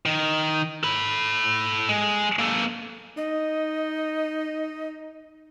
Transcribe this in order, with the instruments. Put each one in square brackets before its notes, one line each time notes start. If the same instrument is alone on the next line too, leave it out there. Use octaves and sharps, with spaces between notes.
[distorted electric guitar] D#3
A4 B5
G#3
A#3 A4
[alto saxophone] D#4 [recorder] D#5